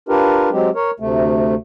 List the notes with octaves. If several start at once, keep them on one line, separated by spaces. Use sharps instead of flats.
D4 F4 G4 A#4 B4
F#3 G#3 C4 G4
A#4 C#5
D2 C3 A3